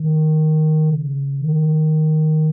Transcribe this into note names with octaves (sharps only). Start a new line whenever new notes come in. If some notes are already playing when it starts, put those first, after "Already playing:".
Already playing: D#3
C#3
D#3